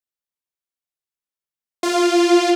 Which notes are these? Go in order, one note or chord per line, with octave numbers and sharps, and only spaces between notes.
F4